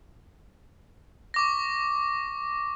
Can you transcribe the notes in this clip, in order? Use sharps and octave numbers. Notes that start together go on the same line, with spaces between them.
C#6 D6 A#6